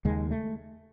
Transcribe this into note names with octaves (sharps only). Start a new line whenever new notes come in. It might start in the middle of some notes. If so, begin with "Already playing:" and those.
D#2 C#3 G#3
A3